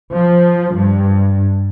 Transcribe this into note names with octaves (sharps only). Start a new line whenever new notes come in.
F3
G2